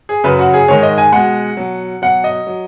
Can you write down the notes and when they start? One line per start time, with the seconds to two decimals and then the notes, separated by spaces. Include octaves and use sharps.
0.09 G#4
0.24 F#2 C#3 F#3 B4
0.39 F#4
0.54 G#4
0.68 G#2 D#3 G#3 C#5
0.83 D#5
0.98 G#5
1.12 B2 G#3 F#5
1.57 B2 F#3
2.02 B2 F#3 F#5
2.24 D#5
2.47 F#3